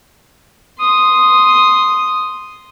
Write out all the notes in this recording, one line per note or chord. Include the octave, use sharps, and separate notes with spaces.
C6 D#6